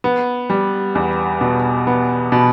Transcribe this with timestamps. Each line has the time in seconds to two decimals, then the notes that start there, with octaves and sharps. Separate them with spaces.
0.04 B3
0.50 G3
0.95 E2
1.41 B2
1.87 B3
2.32 B2